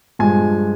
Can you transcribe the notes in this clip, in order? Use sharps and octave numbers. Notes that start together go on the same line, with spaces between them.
G2 F3 G#3 G#5